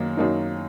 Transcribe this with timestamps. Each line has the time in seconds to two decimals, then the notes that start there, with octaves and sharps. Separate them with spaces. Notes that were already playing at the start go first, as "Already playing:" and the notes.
Already playing: F#2 D#3 A#3 D#4
0.17 F#2 D#3 A#3 D#4